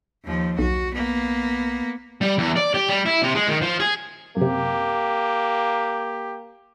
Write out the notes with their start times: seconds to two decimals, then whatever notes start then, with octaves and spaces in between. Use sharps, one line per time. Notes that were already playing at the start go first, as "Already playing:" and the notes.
0.25 D#2 F3
0.59 B1 F#4
0.94 A#3 B3
2.21 G3
2.38 E2
2.56 D5
2.74 G4
2.89 G3
3.06 E4
3.23 C3
3.35 G#3
3.48 D#3
3.62 F3
3.80 G#4
4.37 F#2 C3 A#3 G4